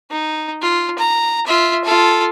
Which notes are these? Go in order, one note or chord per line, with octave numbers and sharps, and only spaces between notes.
D#4
F4
A#5
F4 E5
F4 A4